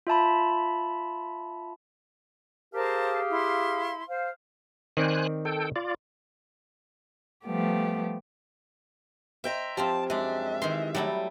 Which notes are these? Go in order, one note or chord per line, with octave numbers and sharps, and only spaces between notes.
F4 E5 A5 B5
G4 G#4 A#4 C5 F5 A5
E4 C6
C5 F5
D#3 C4 C5 D5 G#5 F#6
A4 G5
F4 D5
F3 G3 A3 B3 G4
C5 D#5 E5 G5 A#5 C6
F3 C4 F4 G4 A5
F#2 G#3 D4 E5
D#3 E3 C6
F#3 G3 A3 E4